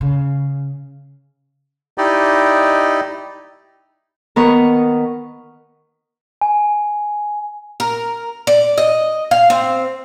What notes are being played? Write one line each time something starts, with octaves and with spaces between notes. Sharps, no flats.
C#3
D#4 E4 G4 D5 D#5
D#3 B3 A#4 C#6
G#5
A#4
D5
D#5
F5
C4